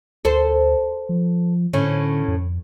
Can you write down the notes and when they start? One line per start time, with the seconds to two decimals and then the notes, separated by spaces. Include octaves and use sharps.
0.25 D2 A4 C5
1.09 F3
1.73 A2 D3 C#4
2.28 F2